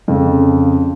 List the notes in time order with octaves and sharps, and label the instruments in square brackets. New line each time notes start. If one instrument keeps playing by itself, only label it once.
[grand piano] F2 C#3